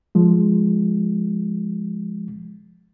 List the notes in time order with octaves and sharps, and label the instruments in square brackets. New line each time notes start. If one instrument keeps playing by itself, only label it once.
[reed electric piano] F3 G#3